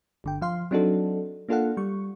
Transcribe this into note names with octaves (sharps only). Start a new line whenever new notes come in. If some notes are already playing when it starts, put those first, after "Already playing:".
G1 D3 G5
F3 F5 C6
F#3 C4 D4 D#4 F#4 A4
A#3 D4 F4 A4 F5 F#5
G3 C#6